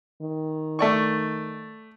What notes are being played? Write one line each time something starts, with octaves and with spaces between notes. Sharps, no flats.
D#3
A3 D5 C#6